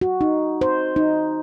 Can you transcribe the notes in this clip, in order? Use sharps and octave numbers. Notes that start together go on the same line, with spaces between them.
F#4
D#4
C5
D#4